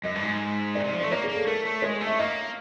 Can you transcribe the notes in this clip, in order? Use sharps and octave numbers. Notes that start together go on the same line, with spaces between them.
F#2 D#5
G2
G#2
A#2 D5
C3
F3
A3 D5
A#3 C#5
G#4
A#3
A4
A3 A#4
A3
G#3 C#5
A3
E5
A#3 D#5